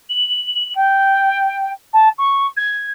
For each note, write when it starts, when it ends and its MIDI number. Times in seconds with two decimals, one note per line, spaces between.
0.09 0.73 102
0.75 1.70 79
1.93 2.08 81
2.18 2.46 85
2.56 2.91 92